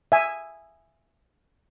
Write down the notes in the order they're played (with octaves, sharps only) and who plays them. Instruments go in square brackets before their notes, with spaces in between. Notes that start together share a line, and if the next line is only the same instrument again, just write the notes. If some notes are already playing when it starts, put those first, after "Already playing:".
[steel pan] E5 G#5